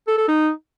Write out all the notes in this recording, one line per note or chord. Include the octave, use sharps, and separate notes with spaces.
A4
A4
D#4